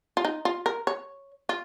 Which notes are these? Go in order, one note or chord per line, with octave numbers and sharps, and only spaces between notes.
F4
D#4
F4
A#4
C#5
F4